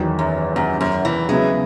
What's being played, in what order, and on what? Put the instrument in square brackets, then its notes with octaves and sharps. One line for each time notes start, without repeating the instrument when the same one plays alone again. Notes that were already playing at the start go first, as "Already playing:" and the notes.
Already playing: [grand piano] E2 D#3 F#3
[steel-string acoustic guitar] F#2
F#2
F#2
E3
[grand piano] C#3 F#3 B3 E4 [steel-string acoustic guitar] G#3